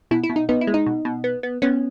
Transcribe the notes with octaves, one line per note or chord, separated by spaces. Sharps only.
B2 E4
E4
B2
D#4
B3 D#4
E4
G#3
D#4
B2
B2
B3
B3
B3 C#4